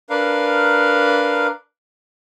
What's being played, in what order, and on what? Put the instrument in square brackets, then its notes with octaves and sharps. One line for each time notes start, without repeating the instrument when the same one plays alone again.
[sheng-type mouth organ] D4 A#4 B4 F5